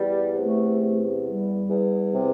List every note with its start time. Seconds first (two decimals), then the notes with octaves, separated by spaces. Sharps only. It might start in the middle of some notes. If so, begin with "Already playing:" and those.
Already playing: E2 G3
0.35 C3 A3
0.80 E2
1.24 G3
1.69 E2
2.14 C3